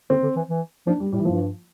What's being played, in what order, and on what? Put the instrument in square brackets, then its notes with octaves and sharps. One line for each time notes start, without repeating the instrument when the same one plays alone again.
[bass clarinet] D3 [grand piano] C4
[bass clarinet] D3
E3
E3
[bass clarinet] F3 [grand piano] D4
[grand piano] G3
[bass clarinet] A2 [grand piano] G3
[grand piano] E3
[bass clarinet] G2 [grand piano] F3